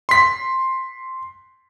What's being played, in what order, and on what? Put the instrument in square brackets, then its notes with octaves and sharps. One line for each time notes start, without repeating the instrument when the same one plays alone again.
[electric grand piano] C6 B6